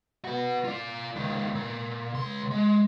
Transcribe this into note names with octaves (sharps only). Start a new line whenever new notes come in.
F#4 B4
F4 D5
C#2 D#3
A#2
C#2 C6
G#3